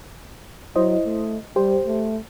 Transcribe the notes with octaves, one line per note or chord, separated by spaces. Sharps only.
F#3 E4 C5 D#5
A3
G3 G4 C5
A3